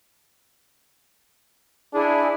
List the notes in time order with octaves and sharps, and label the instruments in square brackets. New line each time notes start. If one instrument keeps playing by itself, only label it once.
[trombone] D4 [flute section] E4 G#4 G#5